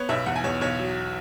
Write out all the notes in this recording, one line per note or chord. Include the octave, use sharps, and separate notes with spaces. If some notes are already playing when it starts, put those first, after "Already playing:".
Already playing: B3 C#5
B1 E5
E2 F#5
G#5
E2 C#5
B1 C#5
F#3